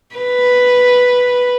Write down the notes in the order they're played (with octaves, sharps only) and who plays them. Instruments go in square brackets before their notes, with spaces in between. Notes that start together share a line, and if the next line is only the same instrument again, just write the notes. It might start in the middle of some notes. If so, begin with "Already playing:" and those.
[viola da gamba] B4